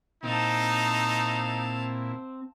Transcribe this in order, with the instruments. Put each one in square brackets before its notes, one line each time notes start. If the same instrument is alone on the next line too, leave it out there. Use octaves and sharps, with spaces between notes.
[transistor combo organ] A#2 E4 [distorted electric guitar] C4 [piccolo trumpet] D#4 [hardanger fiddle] F5 A5